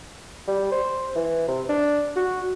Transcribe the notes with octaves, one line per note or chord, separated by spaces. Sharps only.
G3
C5
E3
C3
D4
F#4